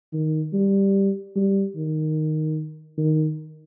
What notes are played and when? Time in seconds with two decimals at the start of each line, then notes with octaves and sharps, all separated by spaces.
0.13 D#3
0.53 G3
1.36 G3
1.76 D#3
2.98 D#3